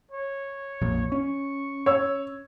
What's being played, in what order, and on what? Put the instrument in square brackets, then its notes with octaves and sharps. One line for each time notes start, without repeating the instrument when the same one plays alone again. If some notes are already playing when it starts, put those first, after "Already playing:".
[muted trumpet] C#5
[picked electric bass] A#1 F2 A#2
[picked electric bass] C#4 [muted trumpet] C#6
[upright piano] C#5 E6